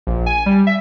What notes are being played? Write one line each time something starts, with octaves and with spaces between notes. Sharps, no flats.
A#1
G#5
G3
E5